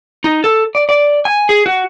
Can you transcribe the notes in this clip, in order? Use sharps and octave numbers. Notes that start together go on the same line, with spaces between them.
D#4
A4
D5
D5
G#5
G#4
F#4